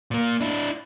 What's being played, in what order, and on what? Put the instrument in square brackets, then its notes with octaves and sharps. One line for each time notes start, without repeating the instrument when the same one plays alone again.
[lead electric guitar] A#2 A#3
D4 E4